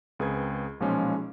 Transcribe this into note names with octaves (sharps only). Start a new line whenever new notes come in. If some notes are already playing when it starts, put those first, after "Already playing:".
C#2 C4 G#4 A#4 B4 G#6
B1 A#2 F3 G#3 C#4